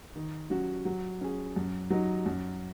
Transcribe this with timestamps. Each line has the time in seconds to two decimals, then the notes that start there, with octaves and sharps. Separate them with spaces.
0.16 D#3
0.50 F#3 C#4 F#4
0.85 F#3
1.21 C#4 G#4
1.56 F#2
1.90 F#3 D#4
2.26 F#2